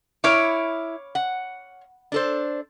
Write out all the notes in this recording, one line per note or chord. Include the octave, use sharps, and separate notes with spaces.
E4 C#5 F5 D6
F#5
D4 A4 C5